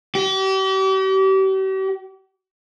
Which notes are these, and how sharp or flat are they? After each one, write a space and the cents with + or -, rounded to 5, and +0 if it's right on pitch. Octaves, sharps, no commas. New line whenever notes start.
G4 -40